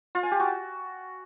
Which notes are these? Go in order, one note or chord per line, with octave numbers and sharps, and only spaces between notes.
F4
G#5
G4
F#4